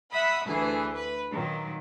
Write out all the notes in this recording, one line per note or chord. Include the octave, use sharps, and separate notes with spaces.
E5 F#5 B5 D#6
D2 E3 G#4
B4
A#2 D#3 F#3